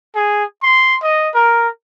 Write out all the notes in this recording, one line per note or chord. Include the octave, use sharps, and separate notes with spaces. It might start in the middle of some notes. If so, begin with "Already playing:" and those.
G#4
C6
D#5
A#4